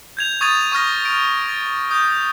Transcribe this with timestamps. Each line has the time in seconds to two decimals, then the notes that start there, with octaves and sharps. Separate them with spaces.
0.17 G6 G#6 F7
0.41 C#6 D#6 G#6 A6 D#7 F7
0.72 C#6 D#6 F6 A#6
1.05 F6 D7
1.48 A6
1.91 D#6 G6